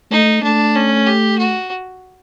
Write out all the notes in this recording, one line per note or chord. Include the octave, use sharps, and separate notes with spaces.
A3 D#4
A3 D4
C#4
G4
F#4